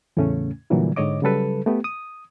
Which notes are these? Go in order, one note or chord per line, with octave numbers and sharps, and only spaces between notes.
E2 A2 C#3 A3 C#4
A#2 D3 E3 F#3 G3
G#2 D3 C#5 D#5 D6
C#3 F#3 G3 A4 B4
A3 B3 G4
D#6